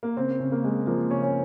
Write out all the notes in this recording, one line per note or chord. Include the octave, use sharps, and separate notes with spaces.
A#3
C#3 C4
C#3
A#3
G#3
F3 A#3
C#3 C#4
C#4